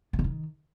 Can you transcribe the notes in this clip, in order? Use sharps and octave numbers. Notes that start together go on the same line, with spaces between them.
B2
C#3
D#3